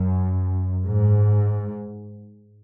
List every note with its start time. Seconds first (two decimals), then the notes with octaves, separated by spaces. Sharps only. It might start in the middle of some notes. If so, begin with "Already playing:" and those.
Already playing: F#2
0.86 G#2